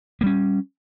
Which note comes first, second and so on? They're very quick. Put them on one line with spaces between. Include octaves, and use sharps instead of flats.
A#3 G3 C#4